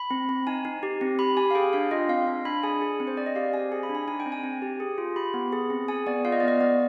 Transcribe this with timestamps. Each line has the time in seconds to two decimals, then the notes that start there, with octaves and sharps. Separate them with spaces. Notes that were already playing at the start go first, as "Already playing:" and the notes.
Already playing: B5
0.11 C4
0.29 C4
0.47 D#4 G#5
0.65 D#4
0.83 G4
1.01 C4
1.19 G4 B5
1.37 G4 G#5
1.51 F5
1.55 G#4 G5
1.73 D4 F5
1.91 F4 D#5
2.09 C4 F5
2.27 D4
2.45 D4 B5
2.63 G#4 G#5
2.81 G#4
3.00 C4
3.07 C5
3.17 C4 D5
3.26 D#5
3.35 G4 F5
3.53 C4 G#5
3.72 G#4 G#5
3.83 B5
3.89 D4
3.95 G#5
4.07 D#4 G#5
4.20 G5
4.26 C4
4.32 G#5
4.44 C4
4.62 G4
4.80 G#4
4.98 F4
5.16 G4 B5
5.34 B3
5.52 G#4
5.70 C4
5.88 G#4 G#5
6.07 B3 D5
6.25 F4 F5
6.32 D#5
6.40 B3 D5
6.48 D#5
6.61 B3 D5